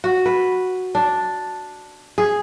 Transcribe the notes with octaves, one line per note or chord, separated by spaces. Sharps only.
F#4
B4
D4
G#4